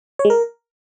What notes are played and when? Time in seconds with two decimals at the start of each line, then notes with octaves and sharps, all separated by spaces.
0.19 C#5
0.25 G#3
0.30 A#4